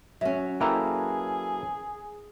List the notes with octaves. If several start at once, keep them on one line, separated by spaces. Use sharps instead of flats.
F#3 C#4 E5
A#3 E4 G#4 A4 B4 G5 A#5